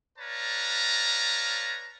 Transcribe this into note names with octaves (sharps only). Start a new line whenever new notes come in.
B4 C#5 D5 F5 A5 A#5